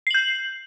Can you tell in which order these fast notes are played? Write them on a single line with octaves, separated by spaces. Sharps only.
C7 F#7 G6